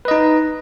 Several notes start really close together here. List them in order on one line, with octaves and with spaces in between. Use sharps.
B4 D#5 D#4